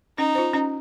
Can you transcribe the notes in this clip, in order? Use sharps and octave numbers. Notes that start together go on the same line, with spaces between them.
C#4 D#4
F4 C5
C#4